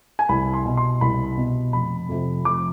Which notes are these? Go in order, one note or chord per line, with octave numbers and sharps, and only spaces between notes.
G#5
C2 B5
C6
B2
C6
C2 B5
B2
F1 B5
F2 C3 F3
F1 D6